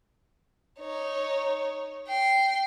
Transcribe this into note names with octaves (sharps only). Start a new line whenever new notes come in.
D#4 C#5
G5 C7